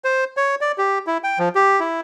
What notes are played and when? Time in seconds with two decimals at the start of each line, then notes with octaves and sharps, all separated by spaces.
0.04 C5
0.37 C#5
0.61 D5
0.78 G4
1.07 E4
1.24 G5
1.39 F3
1.55 G4
1.80 E4